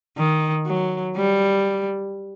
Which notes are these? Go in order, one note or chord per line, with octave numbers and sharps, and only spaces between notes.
D#3
F#3
G3